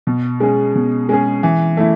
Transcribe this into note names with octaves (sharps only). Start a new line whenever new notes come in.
B2
G#3 C#4 G#4
B2
G#3 C#4 G#4
E3
A3 E4